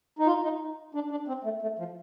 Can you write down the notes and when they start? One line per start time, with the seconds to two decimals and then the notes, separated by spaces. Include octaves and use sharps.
0.19 D#4
0.27 F4
0.44 D#4
0.95 D4
1.11 D4
1.28 C4
1.44 A3
1.62 A3
1.79 F3